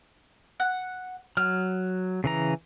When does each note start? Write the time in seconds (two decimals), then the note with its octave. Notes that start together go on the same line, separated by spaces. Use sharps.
0.60 F#5
1.37 F#3 F6
2.24 C#3 E3 A#5